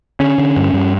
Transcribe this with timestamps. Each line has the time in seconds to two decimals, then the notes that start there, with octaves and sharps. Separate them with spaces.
0.20 D3 C#4
0.38 D3
0.57 G2
0.73 G2